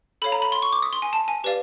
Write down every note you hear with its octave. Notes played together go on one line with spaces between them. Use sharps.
A4 C#5 F5 B5
A#5
B5
C6
C#6
D6
D#6
C6
G#5
A5
G#5
G4 B4 D5 F5